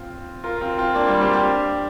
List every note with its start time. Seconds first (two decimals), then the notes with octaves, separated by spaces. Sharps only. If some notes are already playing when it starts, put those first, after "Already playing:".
Already playing: C4 F4
0.44 F4 A#4
0.61 C4 F4
0.78 C4 F4
0.95 A#3 D4
1.08 G3 C4
1.21 G4 C5
1.33 D4 G4